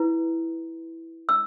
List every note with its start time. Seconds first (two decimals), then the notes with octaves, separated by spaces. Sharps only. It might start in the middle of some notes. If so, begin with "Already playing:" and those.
Already playing: E4 B4
1.29 E6